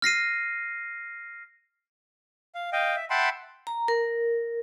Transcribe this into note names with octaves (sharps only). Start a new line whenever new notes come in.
F6 A#6 C7 D#7
F5
D#5 F5 G5
E5
E5 F#5 G5 A5 B5 C6
A#5
A#4